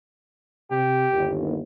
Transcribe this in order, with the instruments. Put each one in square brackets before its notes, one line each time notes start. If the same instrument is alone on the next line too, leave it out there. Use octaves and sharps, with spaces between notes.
[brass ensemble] C3 [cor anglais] G4
[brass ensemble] G1 D#2